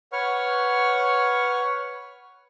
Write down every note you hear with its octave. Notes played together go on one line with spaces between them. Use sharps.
B4 C#5 F#5 C#6 F6